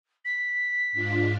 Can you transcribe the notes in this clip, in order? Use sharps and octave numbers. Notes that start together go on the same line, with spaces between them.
B6
G#2 D4 F4